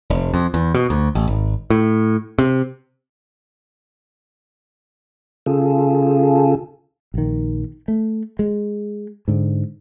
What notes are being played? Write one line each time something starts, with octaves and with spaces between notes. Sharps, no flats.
F1
F2
E2
B2
D2
A1
G#1
A2
C3
C#3 F4 G#4 A4
A#1 D#3
A3
G#3
G#2 D3